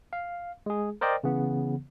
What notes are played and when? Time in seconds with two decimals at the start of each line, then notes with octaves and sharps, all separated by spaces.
0.13 F5
0.66 G#3 G#4
1.01 A#4 C5 D5 D#5 G5
1.24 C#3 E3 B3